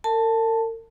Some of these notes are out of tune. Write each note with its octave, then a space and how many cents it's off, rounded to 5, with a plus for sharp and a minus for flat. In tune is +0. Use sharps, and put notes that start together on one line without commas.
A#4 -45 A5 +0